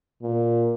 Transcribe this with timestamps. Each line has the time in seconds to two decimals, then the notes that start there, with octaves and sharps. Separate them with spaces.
0.22 A#2